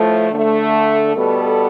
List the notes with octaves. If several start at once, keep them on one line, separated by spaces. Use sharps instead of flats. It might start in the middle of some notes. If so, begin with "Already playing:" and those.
Already playing: A2 F3 A3
D3 A3
B2 G3 B3 A4